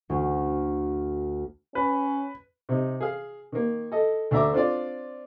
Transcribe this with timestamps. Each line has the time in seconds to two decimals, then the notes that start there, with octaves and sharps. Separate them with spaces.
0.10 D2
1.75 C#4 B4
2.69 C3 D#4
3.00 G#4 F5
3.52 D#3 A#3
3.92 A4 D#5
4.31 D2 D4 E5 A#5 D6
4.53 C4 D4 F4 D5